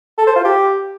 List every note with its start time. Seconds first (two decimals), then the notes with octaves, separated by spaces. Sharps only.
0.18 A4
0.27 C5
0.36 F4
0.45 G4